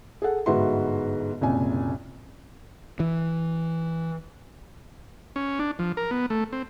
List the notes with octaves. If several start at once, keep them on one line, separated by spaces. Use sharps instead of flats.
G#4 A4 F#5
G1 G#2 F#4 B4 E5 C6
F#1 C2 A#2 G#5
E3
C#4
D4
F3
A#4
B3
A3
C4